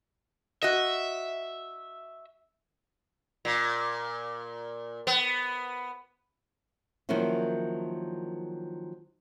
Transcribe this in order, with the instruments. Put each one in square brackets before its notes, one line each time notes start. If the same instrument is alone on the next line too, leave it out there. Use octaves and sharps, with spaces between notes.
[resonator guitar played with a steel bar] F#4 D#5 [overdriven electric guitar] E5
[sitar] A#2
B3
[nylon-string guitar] D#3 F3 F#3 A#3 C#4 E4